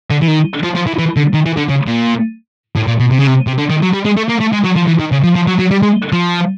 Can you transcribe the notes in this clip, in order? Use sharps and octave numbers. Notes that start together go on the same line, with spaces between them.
D3
E3
D#3
F3
F3
E3
E3
D3
D#3
E3
D3
C#3
A#2
A2
A#2
B2
C3
C#3
C3
C3
D3
D#3
F#3
G3
G#3
A3
A#3
A3
G#3
F#3
F3
E3
D#3
C#3
F3
F3
F#3
F#3
G3
G#3
F3